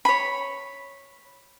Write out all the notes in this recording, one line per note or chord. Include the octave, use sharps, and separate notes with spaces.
C#5 B5